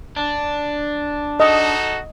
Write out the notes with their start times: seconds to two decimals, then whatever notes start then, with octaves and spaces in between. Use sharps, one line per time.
0.16 D4
1.40 D#4 F#4 A4 D#5